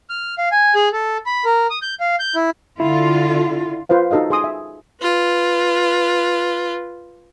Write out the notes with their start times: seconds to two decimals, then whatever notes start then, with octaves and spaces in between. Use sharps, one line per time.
0.10 F6
0.38 F5
0.52 G#5
0.75 G#4
0.93 A4
1.26 B5
1.45 A#4
1.70 D#6
1.82 G6
2.00 F5
2.20 G6
2.36 E4
2.80 D3 E4 F4
3.89 F4 B4 C5 F5
4.11 D#4 F#4 A4 D#5 F5
4.30 G#4 C6 D#6
4.44 E5
5.02 F4 B4